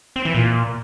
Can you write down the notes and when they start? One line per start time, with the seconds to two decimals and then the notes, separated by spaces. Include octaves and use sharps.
0.16 C4
0.25 E3
0.35 A#2